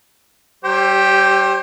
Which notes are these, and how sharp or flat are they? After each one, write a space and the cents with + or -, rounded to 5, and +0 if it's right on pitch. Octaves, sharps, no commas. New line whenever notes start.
G3 -25 G4 +0 C5 +35